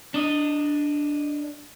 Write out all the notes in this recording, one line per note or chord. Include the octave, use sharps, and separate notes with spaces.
D4 D#5